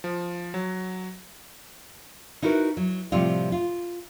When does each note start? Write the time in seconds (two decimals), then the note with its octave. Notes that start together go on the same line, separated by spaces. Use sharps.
0.04 F3
0.54 F#3
2.42 D#4 E4 F#4 A#4 B4
2.77 F#3
3.12 A2 C3 F3 G3 C4 F4
3.52 F4